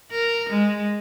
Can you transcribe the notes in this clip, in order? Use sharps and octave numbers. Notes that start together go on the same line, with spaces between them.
A#4
G#3